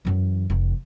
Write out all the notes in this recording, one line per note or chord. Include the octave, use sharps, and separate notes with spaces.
F#2 E3
F1 E3